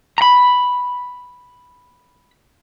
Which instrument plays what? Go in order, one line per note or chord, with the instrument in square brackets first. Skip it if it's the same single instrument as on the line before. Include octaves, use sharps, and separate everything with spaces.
[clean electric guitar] A#5 B5